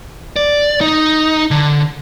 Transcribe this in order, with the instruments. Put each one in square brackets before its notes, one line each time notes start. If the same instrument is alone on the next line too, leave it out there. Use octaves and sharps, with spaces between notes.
[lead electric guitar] D5
D#4
D3